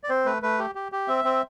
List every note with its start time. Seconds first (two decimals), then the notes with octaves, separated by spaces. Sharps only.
0.04 D5
0.09 C4 C5
0.26 A3 B4
0.42 A3 B4
0.59 G4
0.75 G4
0.92 G4
1.08 C4 E5
1.25 C4